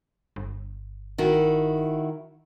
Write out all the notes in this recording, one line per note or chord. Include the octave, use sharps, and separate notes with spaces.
G1
D#3 E4 F#4